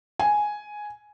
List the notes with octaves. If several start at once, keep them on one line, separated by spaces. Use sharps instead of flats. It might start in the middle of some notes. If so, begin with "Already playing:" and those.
G#5